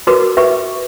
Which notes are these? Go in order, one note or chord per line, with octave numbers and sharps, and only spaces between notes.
F#4 A#4 B4 D6
G4 B4 E5